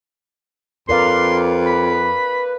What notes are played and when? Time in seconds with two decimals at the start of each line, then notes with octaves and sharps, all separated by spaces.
0.89 F2 A#4 B4 D5 F5 C6
1.66 B5